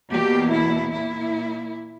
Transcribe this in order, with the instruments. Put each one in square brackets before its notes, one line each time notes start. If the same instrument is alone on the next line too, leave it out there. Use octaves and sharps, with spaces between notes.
[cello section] E2 B2 A#3 G4
E4
A#2 A#3 E4